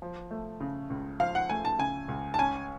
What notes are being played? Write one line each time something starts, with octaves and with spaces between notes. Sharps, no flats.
F3
A3
C#3
C#2
F3 F5
F#5
A3 G#5
A5
C#3 G#5
C#2
A5
C#4 G#5